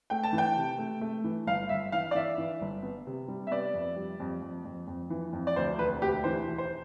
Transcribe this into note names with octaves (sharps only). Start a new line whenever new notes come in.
A3 G5
A5
E3
G5
C3
A3
A3
E3
G1 F5
G1 E5
E3 F5
D5
E3 E5
E3
G1
B3
C3
G3
E5
B3 D5
F2
G3
F2
F2
F2
F2
E3
F2
D5
D2 C5
E1 B4
D2 G4
E3 C5
E1
C5